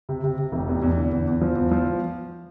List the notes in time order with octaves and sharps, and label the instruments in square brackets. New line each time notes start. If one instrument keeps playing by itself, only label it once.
[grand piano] C3
C3
C3
F1
E2
E2
D3
E2
E2
F3
E2
F3